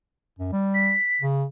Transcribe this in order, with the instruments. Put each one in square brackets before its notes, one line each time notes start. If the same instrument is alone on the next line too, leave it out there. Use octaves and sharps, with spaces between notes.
[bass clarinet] F#2
G3
[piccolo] B6
[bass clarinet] C#3